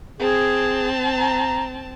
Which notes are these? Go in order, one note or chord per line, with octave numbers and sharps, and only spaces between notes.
C4 G#4 A5
A#5